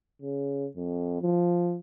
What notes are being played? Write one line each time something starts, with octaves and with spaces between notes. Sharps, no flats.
C#3
F2
F3